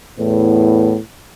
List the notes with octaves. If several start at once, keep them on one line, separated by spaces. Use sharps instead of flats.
E2 A2 B3